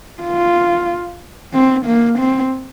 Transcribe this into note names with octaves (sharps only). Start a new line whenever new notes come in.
F4
C4
A#3
C4